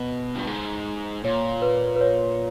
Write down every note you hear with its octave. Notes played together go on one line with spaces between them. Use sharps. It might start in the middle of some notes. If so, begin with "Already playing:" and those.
Already playing: B2
G2
G#2
A#2 C#5
B4
B4
C#5